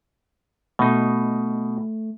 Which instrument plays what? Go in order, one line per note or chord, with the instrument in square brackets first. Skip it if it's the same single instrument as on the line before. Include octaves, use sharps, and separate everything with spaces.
[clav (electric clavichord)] B2 D#4 [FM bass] A3